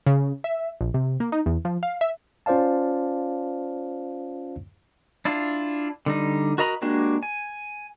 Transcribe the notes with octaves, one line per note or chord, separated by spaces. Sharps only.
C#3
E5
A#1
C3
A#3
D#4
E2
F3
F5
E5
C#4 F4 C5 D5 F5 A5
D4 E4 F4
D3 G3 D#4
F#4 A#4 D#5 A#5 B5
G#3 A#3 D4 F#4 G4
G#5